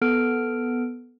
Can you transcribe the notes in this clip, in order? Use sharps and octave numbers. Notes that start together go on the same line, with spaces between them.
B3 A4 F6 D7